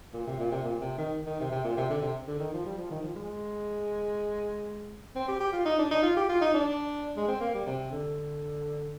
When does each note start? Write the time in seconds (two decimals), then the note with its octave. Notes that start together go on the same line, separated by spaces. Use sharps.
0.14 A#2
0.27 C3
0.39 A#2
0.52 C3
0.64 A#2
0.81 C3
0.98 D#3
1.27 D#3
1.40 C3
1.51 C3
1.65 A#2
1.77 C3
1.90 D3
2.02 C3
2.28 D3
2.40 D#3
2.53 F3
2.65 G3
2.78 F3
2.91 D#3
3.02 F3
3.16 G#3
5.16 C4
5.28 G4
5.40 G4
5.53 F4
5.66 D#4
5.79 D4
5.91 D#4
6.03 F4
6.17 G4
6.29 F4
6.41 D#4
6.54 D4
7.17 G#3
7.28 C4
7.41 A#3
7.54 G3
7.67 C3
7.92 D3